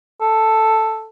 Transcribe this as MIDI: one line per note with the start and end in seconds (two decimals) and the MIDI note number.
0.21 1.08 69